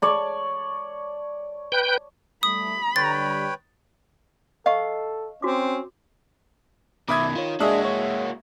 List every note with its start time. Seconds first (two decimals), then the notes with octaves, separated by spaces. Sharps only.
0.02 C#5 D5 A5
1.72 B4 G5 G6
2.43 G3 A3 B5 D#6
2.96 D3 G3 B4 C#5 G5 A6
4.66 A4 D#5 F5 C#6
5.42 C4 C#4 F#4 D6
7.09 B2 D#3 E5 B5 D6 D#6 G#6
7.36 D#3 F4 C#5
7.60 G#3 A#3 D4 F#4 G#4 E5 D#6
7.85 C#5